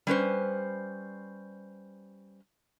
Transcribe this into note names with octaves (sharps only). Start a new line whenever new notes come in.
G3 C#4 B4 C5